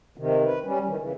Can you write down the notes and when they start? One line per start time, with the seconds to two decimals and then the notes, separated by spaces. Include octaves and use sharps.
0.18 C3 D#3
0.45 B4
0.65 G3 C#4
0.88 D#3 E3
1.00 C#3 E3